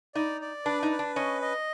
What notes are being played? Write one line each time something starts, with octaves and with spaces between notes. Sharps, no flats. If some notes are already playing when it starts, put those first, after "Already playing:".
D#4 D5
D5
D4 B4
D#4
B4
D4
C#4 D#5
D#5